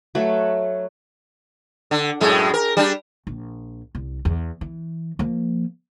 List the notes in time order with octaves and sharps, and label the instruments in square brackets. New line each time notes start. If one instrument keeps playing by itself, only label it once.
[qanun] F#3 A3 B4
[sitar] D3
F#2 A2 G#3
A#4
G3 D4
[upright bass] A#1
C2
E2
E3
F3 A#3